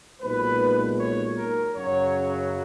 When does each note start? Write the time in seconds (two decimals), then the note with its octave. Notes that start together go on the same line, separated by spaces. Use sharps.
0.21 B1 A#2 G#3 D#4 B4
0.99 C#5
1.37 A#4
1.75 F#2 C#3 F#3 C#5